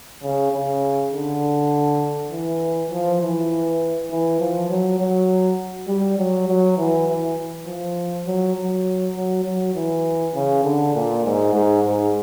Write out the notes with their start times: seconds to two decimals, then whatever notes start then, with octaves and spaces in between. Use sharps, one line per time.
0.23 C#3
0.52 C#3
1.12 D3
2.31 E3
2.91 F3
3.21 E3
4.10 E3
4.40 F3
4.69 F#3
4.99 F#3
5.88 G3
6.18 F#3
6.48 F#3
6.78 E3
7.07 E3
7.67 F3
8.26 F#3
8.56 F#3
9.16 F#3
9.45 F#3
9.75 E3
10.35 C#3
10.64 D3
10.95 A#2
11.24 G#2
11.53 G#2
11.84 G#2